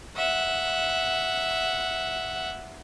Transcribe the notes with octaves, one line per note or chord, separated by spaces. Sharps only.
E5 F#5